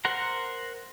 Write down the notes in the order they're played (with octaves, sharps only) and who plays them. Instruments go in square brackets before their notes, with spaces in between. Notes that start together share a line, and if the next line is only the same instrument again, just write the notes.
[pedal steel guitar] A#4 C5 F#5 A#5